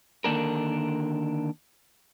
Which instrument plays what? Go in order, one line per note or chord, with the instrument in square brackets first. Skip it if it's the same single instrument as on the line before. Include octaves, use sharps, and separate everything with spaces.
[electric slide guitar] D3 D#3 A#3 D4 A#4